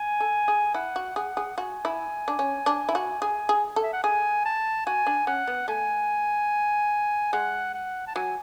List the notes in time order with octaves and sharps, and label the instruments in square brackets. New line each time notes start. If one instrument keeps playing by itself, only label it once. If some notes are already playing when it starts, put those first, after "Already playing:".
Already playing: [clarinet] G#5
[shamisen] A4
G#4
[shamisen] E4 [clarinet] F#5
[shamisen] F#4
[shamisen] G#4 [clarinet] F#5
[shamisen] G#4
[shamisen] F#4 [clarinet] G#5
[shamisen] E4
D4
C#4
D4
E4
F#4
[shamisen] G#4 [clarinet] G#5
[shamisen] G#4
A4
[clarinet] E5
F#5
[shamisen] G#4 [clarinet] G#5
[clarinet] A5
[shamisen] F#4 [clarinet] G#5
[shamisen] D4
[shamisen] C#4 [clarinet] F#5
[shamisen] B3
[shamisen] A3 [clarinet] G#5
[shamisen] G#3 [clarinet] F#5
[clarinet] F#5
A5
[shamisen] F#3 [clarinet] G#5